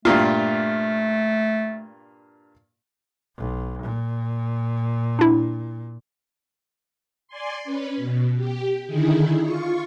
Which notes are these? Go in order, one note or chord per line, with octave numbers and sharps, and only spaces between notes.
G2 A#2 A3 F4
B1
A#2
D4 E4
D5 G#5 C6
C#4 B4
B2
G4
D3 D#3 D#4 E4 G#4
F4 C#6